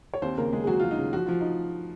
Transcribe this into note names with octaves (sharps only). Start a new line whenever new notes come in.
C#5
D#2 C4 C5
C#3 A#3 A#4
C#3 G#3 G#4
G#4
F#3 F#4
F#3 F4
D#4
C#3
F3 F#4
F3 F4
D#4